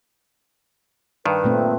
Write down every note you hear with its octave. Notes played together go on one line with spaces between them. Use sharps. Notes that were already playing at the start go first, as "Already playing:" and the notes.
G2 D#3 B4
A#2 A3 C4